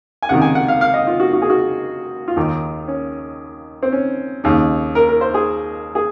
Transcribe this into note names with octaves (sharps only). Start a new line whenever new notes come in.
G#5
C#2 C3 D#3 F#5
G#5
F#5
F5
F5
D#5
F4
F#4
F#4
G#4
F#4
F4
D#2 D#3 D#4
C#4
C4
C#4
D#2 C#3 D#4
A#4
A#4
C5
G#4
G#4